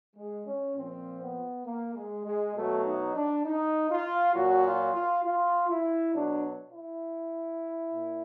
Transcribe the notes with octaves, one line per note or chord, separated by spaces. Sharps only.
G#3
C#4
A#2 F3 C4
B3
A#3
G#3
G#3
B2 F#3 A3
D#4
D4
D#4
F4
A#2 F#3 F#4
F4
F4
F4
E4
B2 F#3 D4
E4
A#2